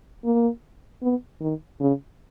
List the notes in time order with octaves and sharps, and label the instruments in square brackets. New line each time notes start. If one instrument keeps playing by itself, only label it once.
[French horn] A#3
B3
D#3
C#3